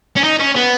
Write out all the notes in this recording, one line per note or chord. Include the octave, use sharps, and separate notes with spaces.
C#4
D#4
C#4
B3